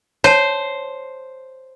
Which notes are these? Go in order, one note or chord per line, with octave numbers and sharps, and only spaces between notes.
C5 C#5 A5